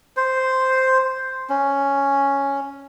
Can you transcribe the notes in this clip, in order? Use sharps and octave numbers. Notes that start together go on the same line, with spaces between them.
C5
C#4